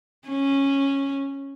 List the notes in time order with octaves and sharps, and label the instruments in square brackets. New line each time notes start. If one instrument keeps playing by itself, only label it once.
[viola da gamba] C#4